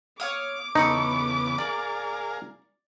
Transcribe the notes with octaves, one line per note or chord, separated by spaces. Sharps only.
C#5 F5 D6 D#6
E2 C#3 B3 D#4 A4 B5 C#6
G#4 A#4 D5 F5